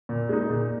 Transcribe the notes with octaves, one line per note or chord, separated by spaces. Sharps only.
A#2
G#3 D#4
A#2